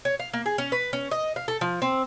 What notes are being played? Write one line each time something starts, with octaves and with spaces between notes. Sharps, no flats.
C#5
F5
A#3
G#4
C#4
B4
C#4
D#5
F5
A4
F3
C4